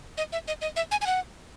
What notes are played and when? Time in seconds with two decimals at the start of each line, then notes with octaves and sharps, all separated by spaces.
0.18 D#5
0.32 E5
0.48 D#5
0.61 D#5
0.76 E5
0.91 G#5
1.01 G#5
1.06 F#5